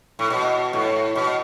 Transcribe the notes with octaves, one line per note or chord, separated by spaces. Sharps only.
A2
B2
A2
B2